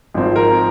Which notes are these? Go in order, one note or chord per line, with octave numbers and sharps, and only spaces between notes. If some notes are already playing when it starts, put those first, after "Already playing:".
G#1 G#2 F3 C4
A#4